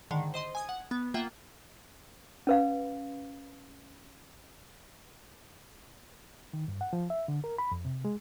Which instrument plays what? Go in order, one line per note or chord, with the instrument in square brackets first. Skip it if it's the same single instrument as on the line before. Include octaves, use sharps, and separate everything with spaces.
[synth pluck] G#2 D3 D#3
C5 D#5 C6
G#5 D#6 G#6
F#5
B3
A#3 F4 E5 F#5 G5
[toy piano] C#4 B4 F5
[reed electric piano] D#3
G2
F#5
F3
E5
D3
A#4
B5
F2
C3
G#3